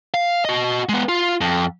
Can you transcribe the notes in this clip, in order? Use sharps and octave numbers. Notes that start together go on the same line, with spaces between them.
F5
F#4 D#5
G#3 B3
F4
F2